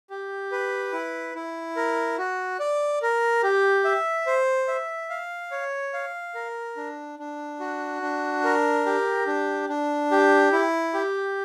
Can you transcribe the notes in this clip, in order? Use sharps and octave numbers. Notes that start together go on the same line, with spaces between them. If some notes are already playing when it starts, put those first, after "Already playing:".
G4
B4
E4
E4
A#4
F#4
D5
A#4
G4
E5
C5
E5
F5
C#5
F5
A#4
D4
D4
F#4
D4
A#4
G4
D4
D4
G4
E4
G4